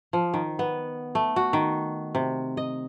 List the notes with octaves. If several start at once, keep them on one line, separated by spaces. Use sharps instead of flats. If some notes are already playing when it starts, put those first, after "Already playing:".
F3
D#3
B3
A3
F#4
D#3
C3
D#5